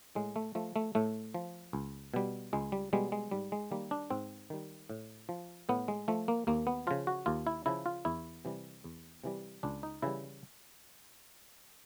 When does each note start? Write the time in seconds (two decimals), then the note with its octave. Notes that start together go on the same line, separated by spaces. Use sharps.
0.15 A2 G#3
0.36 A3
0.55 F3 A3
0.76 A3
0.95 A2 A3
1.34 F3
1.73 C#2
2.14 B2 G3
2.53 C#2 G#3
2.72 G3
2.93 B2 G3 G#3
3.12 G#3
3.31 G#2 G3
3.52 G#3
3.71 D#3 G3 A#3
3.91 D4
4.10 G#2 C4
4.50 D#3 G3
4.90 A2
5.29 F3
5.69 A2 B3
5.88 G#3
6.08 F3 A3
6.28 A#3
6.47 D#2 A#3
6.67 B3
6.87 C#3 F3 F4
7.07 F#4
7.26 D#2 F4
7.47 E4
7.66 C#3 F3 E4
7.86 F4
8.05 E2 E4
8.45 C3 E3 G3
8.84 E2
9.24 C3 E3 G3
9.63 C#2 D4
9.83 D#4
10.02 C#3 E3 G3 E4